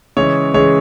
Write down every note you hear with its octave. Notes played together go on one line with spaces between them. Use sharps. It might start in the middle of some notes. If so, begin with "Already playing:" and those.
C#3 E3 G#3 C#5
C#3 E3 G#3 C#5